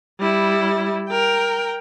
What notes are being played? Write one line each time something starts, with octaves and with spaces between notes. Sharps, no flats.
G3 E4
A#4 G5